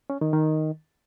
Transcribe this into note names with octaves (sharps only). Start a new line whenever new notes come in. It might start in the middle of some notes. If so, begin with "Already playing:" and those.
C#4
D#3
D#3